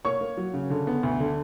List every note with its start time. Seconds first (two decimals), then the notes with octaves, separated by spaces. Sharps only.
0.05 A#3 C#5 C#6
0.21 A#3
0.37 F#3
0.54 C#3
0.70 D3
0.87 B3
1.03 D2
1.20 D3